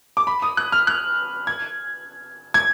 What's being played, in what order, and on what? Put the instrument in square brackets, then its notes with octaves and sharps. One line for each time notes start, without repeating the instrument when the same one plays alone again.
[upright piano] D6
B5
D#6
F#6
F6
F#6
G#6
G#6